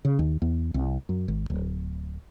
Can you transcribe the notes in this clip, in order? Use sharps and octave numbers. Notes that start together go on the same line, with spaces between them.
C#3
D#2
E2
C2
F#2
G#1
D1